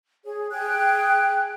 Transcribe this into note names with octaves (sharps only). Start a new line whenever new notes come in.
G#4 C#5
G#4 G5 F#6